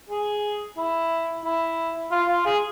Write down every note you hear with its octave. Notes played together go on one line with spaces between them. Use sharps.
G#4
E4
E4
F4
F4
G#4